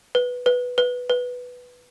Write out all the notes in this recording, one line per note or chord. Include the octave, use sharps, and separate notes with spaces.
B4
B4
B4
B4